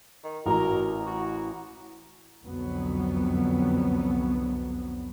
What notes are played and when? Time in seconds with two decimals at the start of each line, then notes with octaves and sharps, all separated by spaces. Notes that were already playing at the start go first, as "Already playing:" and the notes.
0.24 D#3
0.46 A1 F#4 A#4 A#5
1.06 E4 F#4
2.43 C2 F2 D3 F#3 B3